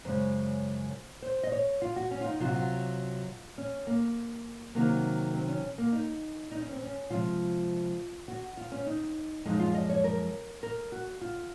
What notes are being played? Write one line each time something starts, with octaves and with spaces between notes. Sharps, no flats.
F#2 C#3 G#3 C5
C5
D#5
C#5
F4
F#4
C#4
F4
D#4
C3 F#3 F4
F#4
F4
C#4
A#3
C3 D#3 F#3 A#3
C4
C#4
A#3
D#4
D#4
C#4
C4
C#4
C3 F3 G#3 F4
F#4
F4
C#4
D#4
F#2 F3 G#3 D#4
F4
D#5
C#5
A#4
A#4
F#4
F4